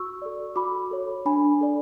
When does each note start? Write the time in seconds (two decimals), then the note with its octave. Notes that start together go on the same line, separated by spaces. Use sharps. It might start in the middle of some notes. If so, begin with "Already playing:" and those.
Already playing: F#4 C#6 E6
0.22 A4 D5
0.56 F#4 B5 D6
0.91 A4 C#5
1.25 D4 G#5 B5
1.61 A4 D5